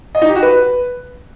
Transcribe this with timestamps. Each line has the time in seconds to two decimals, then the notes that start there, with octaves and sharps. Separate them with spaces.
0.15 D#5
0.22 D#4
0.29 G4
0.36 F#4
0.43 B4